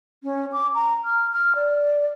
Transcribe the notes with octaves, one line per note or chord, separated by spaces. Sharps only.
C#4
D6
A#5
F6
F6
D5